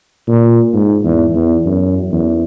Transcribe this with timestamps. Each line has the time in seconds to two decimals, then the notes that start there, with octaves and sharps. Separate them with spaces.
0.28 A#2
0.74 G#2
1.05 E2
1.35 E2
1.66 F#2
2.12 E2